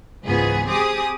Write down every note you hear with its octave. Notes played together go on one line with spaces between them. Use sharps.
C#2 G#2 E3 B3 G#4
C4 G4 G#4 D6 D#6